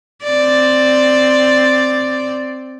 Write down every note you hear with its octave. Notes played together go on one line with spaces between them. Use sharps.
C4 D5